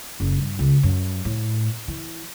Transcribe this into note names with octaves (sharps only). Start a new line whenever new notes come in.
F#1
G2
C#2
F#2
A2
E3